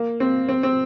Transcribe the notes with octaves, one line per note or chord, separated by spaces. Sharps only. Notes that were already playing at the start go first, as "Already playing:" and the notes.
Already playing: A#3
C4
C4
C4